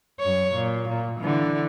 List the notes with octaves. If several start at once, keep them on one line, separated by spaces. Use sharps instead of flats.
F#2 C#5
A#2
A#2
D3 E3